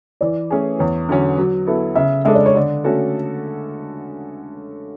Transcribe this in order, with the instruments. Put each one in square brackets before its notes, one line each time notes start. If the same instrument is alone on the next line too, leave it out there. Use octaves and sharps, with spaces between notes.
[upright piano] E3 [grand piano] D5
[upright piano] A3 C#4 G#4
[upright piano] E2 [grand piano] C#5
[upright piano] D3 F#3 C#4
F#3
B3 E4 A4
[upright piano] C#3 [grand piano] E5
[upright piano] G#3 D4 A4 [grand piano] E5
[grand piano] D5
C#5
[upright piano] D3 [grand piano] D5
[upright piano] A3 C#4 F#4 A4